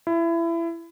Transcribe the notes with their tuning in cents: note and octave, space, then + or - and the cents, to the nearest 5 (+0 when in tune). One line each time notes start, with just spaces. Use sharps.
E4 +25